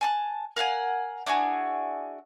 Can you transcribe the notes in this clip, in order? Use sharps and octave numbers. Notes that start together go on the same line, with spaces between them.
G#5 A5 F#6
A#4 F5 F#5 G#5
D4 E4 F#4 G#4